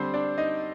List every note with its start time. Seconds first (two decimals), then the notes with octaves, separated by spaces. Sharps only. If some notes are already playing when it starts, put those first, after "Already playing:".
Already playing: D3 G3 C4 D4 C5
0.13 D4 D5
0.38 D#4 D#5